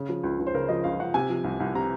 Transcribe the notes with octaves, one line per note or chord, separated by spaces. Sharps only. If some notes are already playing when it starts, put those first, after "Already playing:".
Already playing: C#3
F3
C#2
C#2
C5
C#3 A#4
F3 D#5
C#2 F5
C#2 F#5
C3 G#5
F3
C2
C2
C3 A#5